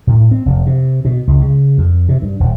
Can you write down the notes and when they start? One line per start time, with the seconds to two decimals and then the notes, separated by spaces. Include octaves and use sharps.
0.07 A2
0.31 C4
0.46 F1
0.67 C3
1.05 B2
1.27 C#2
1.41 C#3
1.78 F2
2.09 C3
2.22 G2
2.40 D#1